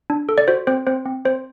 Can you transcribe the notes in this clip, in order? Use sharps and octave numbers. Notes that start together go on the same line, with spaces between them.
D4
A4
D5
F#4 C5
C4 C5
C4 C5
C4
C4 C5